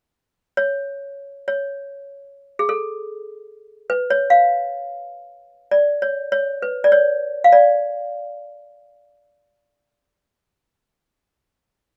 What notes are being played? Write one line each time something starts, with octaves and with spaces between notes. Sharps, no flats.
C#5
C#5
G#4
A4
B4
C#5
F5
D5
C#5
C#5
B4
D5
C#5
F5
D5